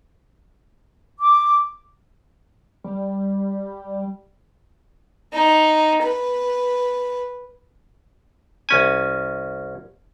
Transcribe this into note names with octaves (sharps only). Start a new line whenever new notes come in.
D6
G3
D#4
B4
C2 C#4 G#5